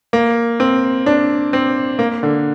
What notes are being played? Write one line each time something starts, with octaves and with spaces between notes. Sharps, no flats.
A#3
C4
D4
C4
A#3
D3